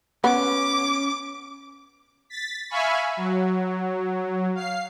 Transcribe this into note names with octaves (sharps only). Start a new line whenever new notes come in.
B3 C#4 D6
A6 B6
E5 F5 G#5 B5 C#6
F#3
F5 C7